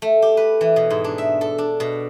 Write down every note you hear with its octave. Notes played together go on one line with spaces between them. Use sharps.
A3
G4
B4
E3
B2
G#2
D4
E5
A4
D4
B2